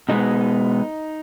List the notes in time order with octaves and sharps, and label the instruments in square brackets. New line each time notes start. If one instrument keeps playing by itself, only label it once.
[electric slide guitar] B2 G#3 B3 D#4